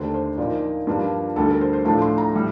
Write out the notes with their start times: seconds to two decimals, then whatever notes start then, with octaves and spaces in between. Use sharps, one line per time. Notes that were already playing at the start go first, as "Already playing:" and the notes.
Already playing: D#2 D3 A3 D4 C5
0.14 C5
0.38 A#2 F3 A#3 D#4 D5
0.87 G2 F3 A#3 D4 F4
1.36 D2 D3 G3 A4
1.49 A#4
1.61 C5
1.73 C5
1.85 A2 F3 A3 D4 A5
2.02 C6
2.18 A#5
2.34 A2 G3